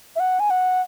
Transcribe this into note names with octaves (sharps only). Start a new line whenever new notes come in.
E5
F#5
G#5
F#5